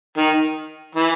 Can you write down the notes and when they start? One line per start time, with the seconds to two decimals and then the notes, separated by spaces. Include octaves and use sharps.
0.18 D#3
0.95 E3